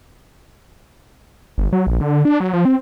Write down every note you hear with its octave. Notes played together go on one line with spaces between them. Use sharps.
G1
F#3
A#1
D3
D4
F#3
F3
C4